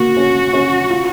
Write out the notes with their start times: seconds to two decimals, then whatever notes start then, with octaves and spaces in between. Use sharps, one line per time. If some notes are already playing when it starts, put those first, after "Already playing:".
Already playing: A#3 F#4
0.17 C#4
0.53 C#4
0.90 F4